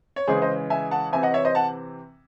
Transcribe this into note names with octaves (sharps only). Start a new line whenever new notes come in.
C#5
C#3 E3 G#3 G#4 C5
C5 D#5
E5 G#5
F#5 A5
C3 E3 C4 E5 G#5
D#5 F#5
C#5 E5
C5 D#5
F#5 A5